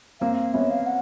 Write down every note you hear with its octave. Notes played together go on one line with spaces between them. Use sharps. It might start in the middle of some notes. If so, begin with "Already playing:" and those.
A#3 C4 F5
F5
B3 C#4 E5
F5
F#5